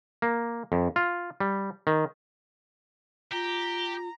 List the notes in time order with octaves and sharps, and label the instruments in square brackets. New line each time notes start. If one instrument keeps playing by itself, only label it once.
[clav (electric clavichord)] A#3
F2
F4
G3
D#3
[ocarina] F4 [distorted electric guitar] G4 [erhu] A#5